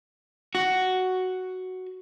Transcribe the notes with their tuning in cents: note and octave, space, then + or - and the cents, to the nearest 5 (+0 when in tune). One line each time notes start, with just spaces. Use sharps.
F#4 +5